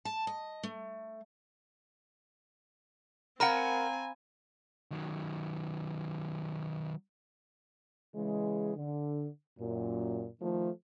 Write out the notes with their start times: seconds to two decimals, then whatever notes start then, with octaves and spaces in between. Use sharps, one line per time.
0.05 A5
0.27 D#5
0.63 A3
3.40 C4 A#4 F5 F#5 G#5 A#5 B5
4.91 D#3 F#3
8.15 C#3 E3 G#3
8.75 D3
9.59 F#2 A#2
10.41 D#3 F3 A3